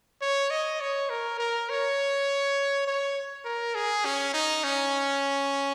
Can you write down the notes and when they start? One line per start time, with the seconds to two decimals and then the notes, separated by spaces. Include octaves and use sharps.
0.22 C#5
0.51 D#5
0.81 C#5
1.10 A#4
1.39 A#4
1.69 C#5
2.87 C#5
3.45 A#4
3.75 G#4
4.05 C#4
4.34 D#4
4.64 C#4